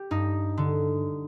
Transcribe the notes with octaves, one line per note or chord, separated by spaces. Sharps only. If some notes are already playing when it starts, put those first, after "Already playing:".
Already playing: G4
G2 D#4
D3